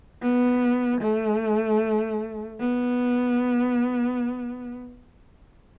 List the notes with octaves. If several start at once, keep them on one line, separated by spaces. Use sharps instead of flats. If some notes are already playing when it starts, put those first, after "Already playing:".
B3
A3
B3